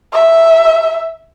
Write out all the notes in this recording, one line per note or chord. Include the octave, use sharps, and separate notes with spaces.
E5